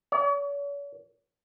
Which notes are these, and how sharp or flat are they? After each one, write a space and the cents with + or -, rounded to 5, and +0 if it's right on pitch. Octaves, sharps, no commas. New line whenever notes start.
C#5 +45